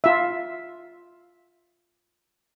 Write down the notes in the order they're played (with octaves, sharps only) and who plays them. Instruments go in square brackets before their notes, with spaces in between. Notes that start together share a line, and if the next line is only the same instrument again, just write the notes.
[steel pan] F4 E5